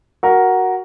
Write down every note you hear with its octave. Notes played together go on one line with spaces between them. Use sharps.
F#4 A#4